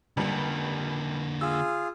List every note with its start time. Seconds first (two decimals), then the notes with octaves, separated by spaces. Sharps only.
0.17 C#2 D3 G3 A#3
1.41 F4 G#4 E6